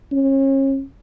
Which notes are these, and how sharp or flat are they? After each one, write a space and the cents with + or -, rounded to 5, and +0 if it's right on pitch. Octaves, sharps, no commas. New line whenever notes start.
C#4 -35